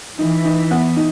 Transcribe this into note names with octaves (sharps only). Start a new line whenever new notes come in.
E3 D#4
D#4
B3
D#4